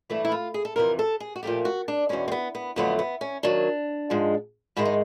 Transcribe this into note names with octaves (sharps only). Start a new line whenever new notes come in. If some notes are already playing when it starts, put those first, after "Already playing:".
G2 E3 A3 E4
E4
F4
G#4
A4
F2 C3 E3 A#4
A4
G#4
F#4
A#2 F3 A3 G4
F#4
D4
E2 B2 G#3 C#4
C4
B3
B3
F2 D3 F#3 A3 B3
B3
C#4
D#2 D#3 F#3 D4
G#2 F3 G#3
G#2 D#3 G#3 E4
D#4